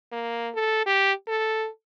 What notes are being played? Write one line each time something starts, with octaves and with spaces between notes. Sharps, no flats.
A#3
A4
G4
A4